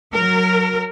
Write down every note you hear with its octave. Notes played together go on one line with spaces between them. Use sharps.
F#3 A#4